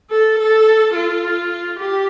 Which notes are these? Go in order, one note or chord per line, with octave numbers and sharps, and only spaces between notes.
A4
A4
F4
G4